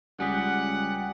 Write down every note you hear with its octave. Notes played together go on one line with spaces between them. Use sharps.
C#2 G3 F#5 G#5 D#6 B6